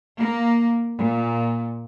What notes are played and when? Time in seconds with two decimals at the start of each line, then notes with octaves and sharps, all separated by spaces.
0.19 A#3
0.98 A#2